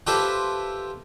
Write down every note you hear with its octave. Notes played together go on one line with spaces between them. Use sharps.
F4 G4 A4 B4 C5 E5